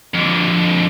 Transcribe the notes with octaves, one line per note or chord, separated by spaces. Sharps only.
F2 D3